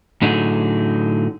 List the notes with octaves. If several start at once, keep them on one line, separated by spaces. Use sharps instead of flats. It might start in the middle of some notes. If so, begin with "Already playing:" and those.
A2 D3 F#3 D#4 G#4